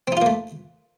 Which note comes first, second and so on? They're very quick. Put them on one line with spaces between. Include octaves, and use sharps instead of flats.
C4 D#4 F4 A#3 A3